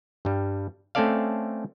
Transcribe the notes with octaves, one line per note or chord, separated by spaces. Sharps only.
G2 G3
A3 C4 C#4 A4 D5 F5